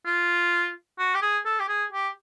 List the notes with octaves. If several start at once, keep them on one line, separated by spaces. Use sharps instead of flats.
F4
F#4
G4
G#4
A4
G4
G#4
G4